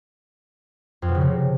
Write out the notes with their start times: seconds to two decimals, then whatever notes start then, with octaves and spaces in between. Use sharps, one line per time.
1.02 F2
1.08 B2
1.15 C#3
1.21 C3